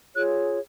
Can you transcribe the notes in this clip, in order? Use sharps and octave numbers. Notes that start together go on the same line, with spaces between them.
F4 G#4 C#5 F#6